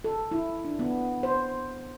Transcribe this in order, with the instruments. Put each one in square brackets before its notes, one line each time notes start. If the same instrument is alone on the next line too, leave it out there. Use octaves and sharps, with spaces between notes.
[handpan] A4
E4
D4
B3
C5